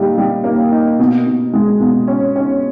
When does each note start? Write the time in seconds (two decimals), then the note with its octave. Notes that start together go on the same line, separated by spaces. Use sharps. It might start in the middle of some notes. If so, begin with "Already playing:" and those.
Already playing: A#2 G3 D#4
0.18 G3
0.44 A#3
0.72 D#4
0.99 B2
1.27 B2
1.53 G#3
1.80 B2
2.08 C#4
2.36 C#4